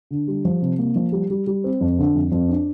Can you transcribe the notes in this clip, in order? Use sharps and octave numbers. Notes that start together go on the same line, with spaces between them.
D3
G3
F3
C3
A#3
F3
G3
G3
G3
C4
F2
D3
F2
F2
D4